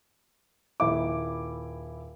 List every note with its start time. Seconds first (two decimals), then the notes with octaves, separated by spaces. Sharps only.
0.80 D#1 E4 D6